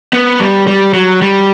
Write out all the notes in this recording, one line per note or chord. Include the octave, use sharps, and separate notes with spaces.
B3
G3
G3
F#3
G3